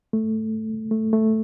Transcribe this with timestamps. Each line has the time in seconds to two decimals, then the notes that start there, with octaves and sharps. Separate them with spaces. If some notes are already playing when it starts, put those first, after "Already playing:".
0.13 A3
0.91 A3
1.13 A3